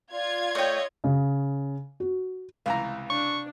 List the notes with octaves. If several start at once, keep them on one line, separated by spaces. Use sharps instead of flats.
F4 D5 G#6
A3 C#5 D#5 G5
C#3
F#4
C#2 C3 E3 F5 A#5
D4 C#6